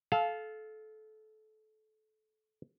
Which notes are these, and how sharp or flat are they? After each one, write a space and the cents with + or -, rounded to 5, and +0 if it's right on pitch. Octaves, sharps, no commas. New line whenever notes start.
A4 -25 F5 +0